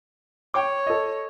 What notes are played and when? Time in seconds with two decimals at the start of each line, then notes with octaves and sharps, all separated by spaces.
0.54 C#5 G5 D6
0.87 A4 D#5